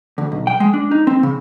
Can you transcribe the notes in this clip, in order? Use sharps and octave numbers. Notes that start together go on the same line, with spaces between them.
D2
B1
G5
G#3
D4
D#4
C4
C#3